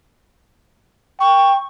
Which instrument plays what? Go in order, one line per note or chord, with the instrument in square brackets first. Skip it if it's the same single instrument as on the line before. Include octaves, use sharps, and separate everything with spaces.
[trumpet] G5 [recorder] C#6